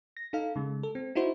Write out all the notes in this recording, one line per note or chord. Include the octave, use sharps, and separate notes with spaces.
A#6
D#4 A4 F5
C#3 G#3
A4
C4
D#4 E4 F#4 C5